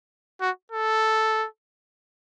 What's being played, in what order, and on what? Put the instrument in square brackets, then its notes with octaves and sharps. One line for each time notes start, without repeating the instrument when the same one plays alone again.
[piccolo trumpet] F#4
A4